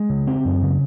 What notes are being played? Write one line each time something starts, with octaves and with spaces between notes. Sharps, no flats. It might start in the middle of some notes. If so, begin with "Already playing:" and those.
Already playing: G#3
C#3
C4
F#2
C#3